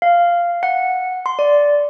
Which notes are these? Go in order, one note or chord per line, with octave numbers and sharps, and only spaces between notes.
F5
F#5
C6
D5